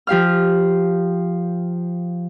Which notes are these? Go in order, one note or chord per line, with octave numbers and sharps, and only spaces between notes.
F3 G4 F5 F6